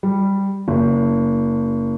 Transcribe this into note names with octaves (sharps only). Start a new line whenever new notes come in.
G3
F#1